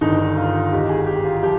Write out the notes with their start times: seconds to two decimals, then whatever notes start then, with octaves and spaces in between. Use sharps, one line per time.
0.01 G1 G2 D#3 D#4
0.37 F4
0.72 G#1 G#2 D#3 G4
0.89 G#4
1.07 G4
1.24 F4
1.43 F3 G4